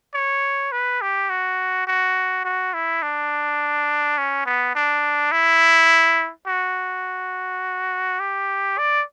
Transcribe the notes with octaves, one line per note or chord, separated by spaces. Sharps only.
C#5
B4
G4
F#4
F#4
F#4
E4
D4
C#4
B3
D4
E4
F#4
G4
D5